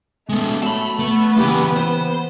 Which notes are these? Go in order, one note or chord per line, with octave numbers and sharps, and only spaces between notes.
G#3 A3 B3
F#3 A5 B5
A3 B3
C#3 E3 A#3 G4
C5